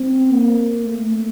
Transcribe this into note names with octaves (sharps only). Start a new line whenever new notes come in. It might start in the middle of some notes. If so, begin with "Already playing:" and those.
Already playing: C4
A#3
A3